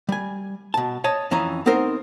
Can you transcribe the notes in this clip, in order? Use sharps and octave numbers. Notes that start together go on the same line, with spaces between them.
G3 G#5
B2 A5
C#5 D#5 A5
F2 E3 C#4 D#5 A#5
B3 C4 D#4 A#4 C5